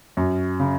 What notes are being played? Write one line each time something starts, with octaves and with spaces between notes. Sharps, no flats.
F#2
C#3